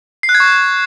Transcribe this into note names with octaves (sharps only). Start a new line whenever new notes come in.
C7
F#6
G#6
C#6